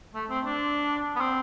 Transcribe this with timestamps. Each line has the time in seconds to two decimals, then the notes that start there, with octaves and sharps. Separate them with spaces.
0.14 A3
0.30 C4
0.45 D4
1.16 B3
1.20 C4